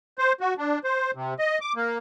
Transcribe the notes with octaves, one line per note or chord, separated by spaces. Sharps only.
C5
F#4
D4
C5
C3
D#5
D6
A#3